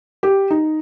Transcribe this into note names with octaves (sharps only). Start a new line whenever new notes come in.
G4
D#4